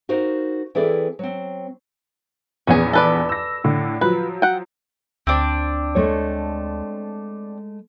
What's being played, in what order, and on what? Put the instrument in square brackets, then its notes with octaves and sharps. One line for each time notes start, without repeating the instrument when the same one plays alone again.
[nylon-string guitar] D#4 F#4 A#4 C5 F5
E3 C4 E4 G#4 A4 D5
F#3 C4
[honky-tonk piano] A#1 E2 B3 [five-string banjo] C#4 G#4
[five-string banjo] A4 B4 D5
[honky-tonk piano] E6 A#6
A2 D3
[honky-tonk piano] F3 F#3 [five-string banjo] B4
[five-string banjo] F#5 G5
[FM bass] D2 [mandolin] C4 D4
[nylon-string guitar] G#3 A3 C#5